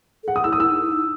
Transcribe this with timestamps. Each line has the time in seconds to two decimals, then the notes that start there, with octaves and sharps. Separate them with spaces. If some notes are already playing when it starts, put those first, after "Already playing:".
0.23 A4
0.28 G#4 F#5
0.36 D#6
0.44 E4 E6
0.53 D#6
0.60 E4 E6
0.71 D#4
0.82 E4
0.92 D#4